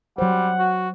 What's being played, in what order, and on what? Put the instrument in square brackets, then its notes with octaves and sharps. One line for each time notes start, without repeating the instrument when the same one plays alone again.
[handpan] F#3 C5 [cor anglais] G3 [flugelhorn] F#5
[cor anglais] F#4